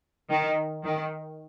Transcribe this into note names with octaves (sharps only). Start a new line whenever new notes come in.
D#3
D#3